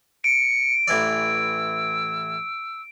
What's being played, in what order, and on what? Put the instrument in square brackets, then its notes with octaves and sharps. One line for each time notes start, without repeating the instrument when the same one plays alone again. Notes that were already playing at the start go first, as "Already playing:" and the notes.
[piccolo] C#7 [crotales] D7
[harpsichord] A1 E3 D5 [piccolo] E6